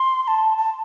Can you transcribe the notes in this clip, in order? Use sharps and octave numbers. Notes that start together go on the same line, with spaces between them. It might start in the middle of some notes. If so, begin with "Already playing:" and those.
Already playing: C6
C6
A5
A5